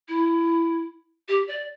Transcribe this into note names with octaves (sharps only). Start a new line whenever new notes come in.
E4
G4
D5